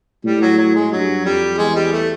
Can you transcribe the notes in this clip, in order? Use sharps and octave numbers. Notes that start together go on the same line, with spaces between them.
A2 G3
F#3
F#3
G#3
G2 F#3
F2 G3
E2 G#3
G3
A3